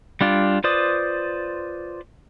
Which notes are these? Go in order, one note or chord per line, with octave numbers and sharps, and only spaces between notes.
G3 D4 F4
F4 B4 C5 D5 D#6